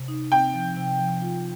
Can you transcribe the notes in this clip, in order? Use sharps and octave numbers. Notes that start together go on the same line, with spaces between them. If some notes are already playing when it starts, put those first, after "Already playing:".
Already playing: C3
D#4
C4 G5
F3
C3
F3
F4